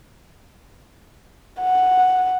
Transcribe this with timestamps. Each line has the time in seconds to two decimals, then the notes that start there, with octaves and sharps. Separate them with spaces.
1.61 F#5